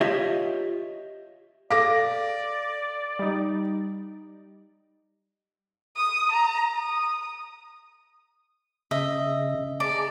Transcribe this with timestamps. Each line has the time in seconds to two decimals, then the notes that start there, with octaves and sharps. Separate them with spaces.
0.01 F4 G4 C#5 D#5 E5
1.71 A4 D5 F5 D6 A#6
3.19 G3 D#4
5.96 D#6
6.31 A#5
6.75 D#6
8.91 C#3 D#5 E5
9.80 G#4 D5 A5 A#5